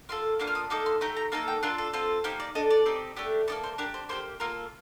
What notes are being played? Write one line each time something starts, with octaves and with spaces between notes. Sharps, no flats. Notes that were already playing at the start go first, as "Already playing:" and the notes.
A#3 F4 A4 C6
A#3 D4 F4 D6
F6
D#6
A#3 D#4 A4 D6
C6
A3 D#4 G4 A#5
A#5
A#3 D#4 A4 A5
G5
D4 F4 A4 A#4
A4
C4 F4 A4
A#3 D#4 G4 C5
D5
D4 A4 D#5
D5
C4 D#4 G4
A3 D4 G4
A#3 D#4 A4 D5
C5
D4 G4 A#4
C5
A#3 D4 G4 C5
A#3 F4 A4 A#4